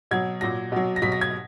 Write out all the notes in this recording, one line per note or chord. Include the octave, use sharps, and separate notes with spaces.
B2 F#3 G#6
A#2 F#3 A#6
B2 F#3
A#6
B2 F#3 B6
A#6
G#6